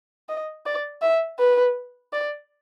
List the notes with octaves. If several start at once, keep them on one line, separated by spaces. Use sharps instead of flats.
D#5
D5
E5
B4
D5